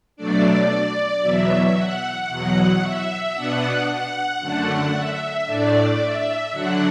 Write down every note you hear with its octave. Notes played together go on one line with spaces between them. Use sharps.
B2 F#3 A3 D4 D5
E2 B2 F#3 E5
F#5
E2 B2 F#3 F#5
E5
B2 B3 D4 F#5
F#5
F#2 D3 A3 D4 F#5
E5
A2 A3 D4 D5
E5
D3 F#3 D4 F#5